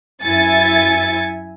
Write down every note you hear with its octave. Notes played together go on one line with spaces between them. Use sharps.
F#2 E4 E5 G#5 A6 C#7